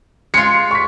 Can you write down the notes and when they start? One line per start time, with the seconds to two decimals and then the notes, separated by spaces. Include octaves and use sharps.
0.34 G#3 F4 C#7
0.71 C#6 B6